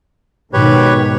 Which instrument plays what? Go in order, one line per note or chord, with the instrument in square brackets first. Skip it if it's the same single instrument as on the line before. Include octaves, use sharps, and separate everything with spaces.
[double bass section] G#2 B2 D#3 [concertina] G4 B4 C#5